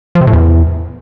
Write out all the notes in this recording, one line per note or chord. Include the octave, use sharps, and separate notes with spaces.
F3
C3
A2
E2